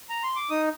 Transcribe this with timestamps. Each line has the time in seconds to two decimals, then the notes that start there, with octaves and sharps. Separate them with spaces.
0.09 A#5
0.23 C6
0.36 D6
0.50 D#4 D#6